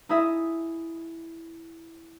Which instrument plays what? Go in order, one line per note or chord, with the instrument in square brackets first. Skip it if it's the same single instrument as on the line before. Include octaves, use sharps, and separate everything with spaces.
[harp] D#4 E4 G#4 D#5 E5